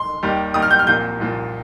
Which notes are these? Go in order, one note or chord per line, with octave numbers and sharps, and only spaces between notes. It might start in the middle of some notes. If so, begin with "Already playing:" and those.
Already playing: C6
D#2 D#3 G3
D#2 D#3 G3 D#6
F6
G6
F6
C2 A#2 F3 A#3 G6
C2 A#2 F3 A#3